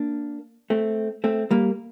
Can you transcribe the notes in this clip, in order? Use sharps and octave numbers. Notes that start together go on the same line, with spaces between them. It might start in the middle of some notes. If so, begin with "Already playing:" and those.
Already playing: A#3 D4
A3 C4
A3 C4
G3 A#3